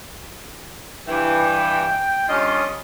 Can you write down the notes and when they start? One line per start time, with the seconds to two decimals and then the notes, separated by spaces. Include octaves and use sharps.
1.08 G2 E3 G5
2.29 G2 C#4 F4 D#5